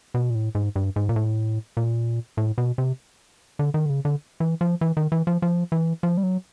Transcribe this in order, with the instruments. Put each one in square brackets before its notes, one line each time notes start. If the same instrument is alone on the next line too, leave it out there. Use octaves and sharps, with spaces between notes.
[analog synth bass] B2
A#2
A2
G#2
G2
G#2
A#2
A2
A#2
A2
B2
C3
D3
D#3
D3
C#3
D3
E3
F3
E3
D#3
E3
F3
F3
E3
F3
G3
F#3